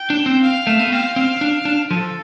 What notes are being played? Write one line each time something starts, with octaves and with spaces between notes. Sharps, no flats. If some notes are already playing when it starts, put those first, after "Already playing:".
Already playing: G5
D4
C4
F5
A3
B3
C4 F5
C4
D4
D4
F3 A4